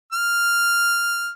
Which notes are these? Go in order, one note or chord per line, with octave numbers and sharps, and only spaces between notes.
F6